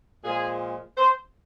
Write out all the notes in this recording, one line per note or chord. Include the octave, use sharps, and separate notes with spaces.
A#2 F3 G#3 G#4
C5